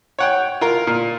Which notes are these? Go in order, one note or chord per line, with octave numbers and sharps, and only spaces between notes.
C#5 F#5 G5
F4 A#4
A#2